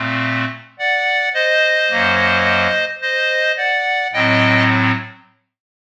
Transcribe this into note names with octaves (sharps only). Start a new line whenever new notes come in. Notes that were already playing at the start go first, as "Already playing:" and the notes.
Already playing: A#2 A3 C4
D5 F#5
C5 D#5
F#2 F#3 A#3
C5 D#5
D5 F#5
A2 F#3 C4 D#5 G5